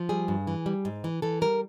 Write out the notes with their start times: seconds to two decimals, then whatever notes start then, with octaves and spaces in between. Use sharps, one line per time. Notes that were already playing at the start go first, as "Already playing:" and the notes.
Already playing: F3
0.09 G3 G#4
0.28 G2
0.47 E3
0.66 G3
0.85 G#2
1.04 E3
1.22 E3 A4
1.41 G3 A#4